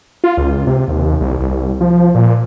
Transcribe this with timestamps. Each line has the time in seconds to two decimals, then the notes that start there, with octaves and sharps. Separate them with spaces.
0.24 F4
0.37 C#2
0.67 C3
0.88 D#2
1.21 C2
1.39 C2
1.81 F3
2.15 A#2